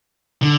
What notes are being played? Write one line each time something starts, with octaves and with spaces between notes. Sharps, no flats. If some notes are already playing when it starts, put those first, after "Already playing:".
D3